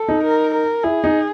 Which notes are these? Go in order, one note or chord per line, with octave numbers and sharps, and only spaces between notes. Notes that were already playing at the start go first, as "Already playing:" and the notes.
Already playing: A4
D#4
A#4
A#4
E4 G#4
D#4